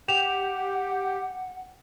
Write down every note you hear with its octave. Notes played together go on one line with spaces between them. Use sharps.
G4 F#5 G5 E7 F7